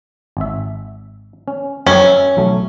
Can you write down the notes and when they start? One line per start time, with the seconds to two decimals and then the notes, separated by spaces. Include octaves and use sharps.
0.37 G#1 E5
1.48 C#4
1.87 F#2 C#4 A#5
2.07 E5
2.37 B1 F#3 A3